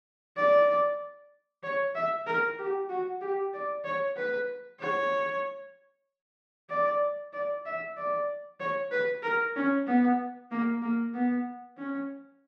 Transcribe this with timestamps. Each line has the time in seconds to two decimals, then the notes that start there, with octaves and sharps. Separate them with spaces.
0.37 D5
1.63 C#5
1.95 E5
2.26 A#4
2.59 G4
2.90 F#4
3.21 G4
3.54 D5
3.85 C#5
4.16 B4
4.80 C#5
6.70 D5
7.33 D5
7.66 E5
7.97 D5
8.60 C#5
8.92 B4
9.23 A#4
9.56 C#4
9.87 B3
10.51 A#3
10.82 A#3
11.14 B3
11.77 C#4